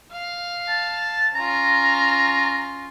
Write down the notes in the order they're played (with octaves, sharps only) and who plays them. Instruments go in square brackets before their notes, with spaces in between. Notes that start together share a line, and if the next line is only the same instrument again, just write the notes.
[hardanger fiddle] F5
[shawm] A5
[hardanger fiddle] C#4 F4 [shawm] A#5